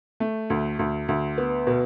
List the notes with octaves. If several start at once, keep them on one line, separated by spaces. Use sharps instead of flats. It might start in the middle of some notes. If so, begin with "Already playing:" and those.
A3
D2
D2
D2
B3
B2